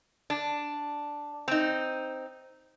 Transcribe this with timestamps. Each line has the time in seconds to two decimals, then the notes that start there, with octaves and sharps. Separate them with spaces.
0.30 D4
1.48 C4 D#4